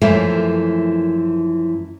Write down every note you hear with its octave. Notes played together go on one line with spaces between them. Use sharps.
F#2 E3 F3 A3 A#3 E4